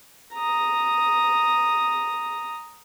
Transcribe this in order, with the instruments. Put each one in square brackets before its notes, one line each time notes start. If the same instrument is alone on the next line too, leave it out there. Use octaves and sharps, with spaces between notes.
[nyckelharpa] A#5 D#6